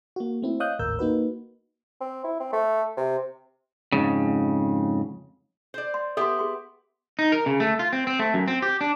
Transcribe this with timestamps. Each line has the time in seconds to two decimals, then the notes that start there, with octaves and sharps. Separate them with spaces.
0.16 A#3 F#4
0.42 A3 C4 E4
0.60 C#5 D#5 F5 D#6 F#6 G6
0.79 G#1 D#2 A2 A#4 E6 G6
0.99 A#3 D#4 F#4 B4
2.01 C4
2.24 E4
2.40 C4
2.53 A3
2.97 C3
3.92 F2 G#2 C#3
5.74 C5 D5
5.94 C6
6.17 B3 G4 A4 E5 C6
6.39 G#4 C6
7.19 D#4
7.32 A#4
7.46 C#3
7.60 A3
7.79 F4
7.93 C4
8.07 C4
8.19 A3
8.34 F#2
8.48 C4
8.62 G4
8.81 D4